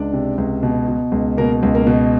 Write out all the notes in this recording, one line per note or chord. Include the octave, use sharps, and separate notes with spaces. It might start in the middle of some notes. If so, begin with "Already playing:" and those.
Already playing: C#2 D4 D5
C3
C#2
B2
B2
C#2
B2 A#3 A#4
C#2
A#3 A#4
B2